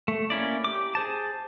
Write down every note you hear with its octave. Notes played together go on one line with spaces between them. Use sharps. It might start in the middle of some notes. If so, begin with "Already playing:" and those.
A3
A#3 C#4 E4 D5
G4 D6
G#4 C5 A5